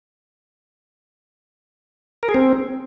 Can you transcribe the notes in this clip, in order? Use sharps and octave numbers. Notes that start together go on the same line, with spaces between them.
A#4
G#4
C4